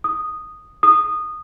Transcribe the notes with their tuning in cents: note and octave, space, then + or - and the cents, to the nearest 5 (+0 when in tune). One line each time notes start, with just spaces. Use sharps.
D#6 -10
D#6 -15